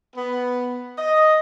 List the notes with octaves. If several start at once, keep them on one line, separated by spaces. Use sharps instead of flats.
B3
D#5